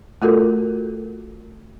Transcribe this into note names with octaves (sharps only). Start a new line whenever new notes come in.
A3 F4 F#4 A4 A#4